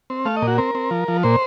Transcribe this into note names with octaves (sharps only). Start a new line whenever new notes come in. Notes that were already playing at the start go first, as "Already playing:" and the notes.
C4
A3 F5
D#5
A#2
F#4
C4 A#4
C4
F3
F3
A#2 C5